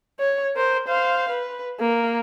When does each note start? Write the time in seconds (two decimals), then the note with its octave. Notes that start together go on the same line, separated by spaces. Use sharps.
0.19 C#5
0.55 A#4 C5
0.88 C5 F5
1.30 B4
1.80 A#3